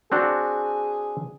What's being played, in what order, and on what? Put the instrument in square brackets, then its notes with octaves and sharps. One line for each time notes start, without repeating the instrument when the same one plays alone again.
[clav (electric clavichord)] C4 D4 F#4 [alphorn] G#4